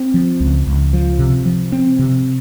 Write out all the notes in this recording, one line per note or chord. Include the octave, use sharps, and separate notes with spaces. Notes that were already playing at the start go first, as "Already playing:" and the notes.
Already playing: C4
F3
C#2
C#2
F3
C3
F3
C4
C3